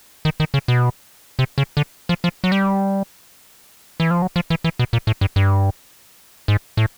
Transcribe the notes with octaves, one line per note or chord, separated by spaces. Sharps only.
D#3
D#3
C#3
B2
C3
C#3
D3
F3
F3
F#3
G3
E3
F3
F#3
F3
E3
E3
B2
A#2
A2
G2
G2
G#2
A2